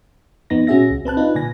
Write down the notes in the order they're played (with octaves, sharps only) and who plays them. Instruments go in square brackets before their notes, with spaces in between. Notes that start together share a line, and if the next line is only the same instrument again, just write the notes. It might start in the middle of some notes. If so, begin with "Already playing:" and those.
[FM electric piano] F2 B3 D#4 A#6
A#2 C#4 F#4 G#4 E5 A#6
C#2
C4 B4 A5 F#6
D4 D#4 F4 B4
A#2 D3 G#5 A#6